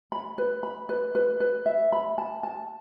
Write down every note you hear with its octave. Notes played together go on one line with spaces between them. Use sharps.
B5
B4
B5
B4
B4
B4
E5
B5
A5
A5